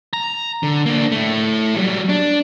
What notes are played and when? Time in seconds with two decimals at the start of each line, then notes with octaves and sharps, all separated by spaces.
0.13 A#5
0.63 D3
0.86 A#3 D4
1.12 A3 E4
1.76 F#3 G3
2.09 D4